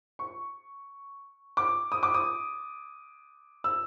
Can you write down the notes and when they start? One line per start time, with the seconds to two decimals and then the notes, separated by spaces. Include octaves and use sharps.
0.19 C#6
1.57 D6
1.92 D#6
2.03 D6
2.14 D#6
3.64 E6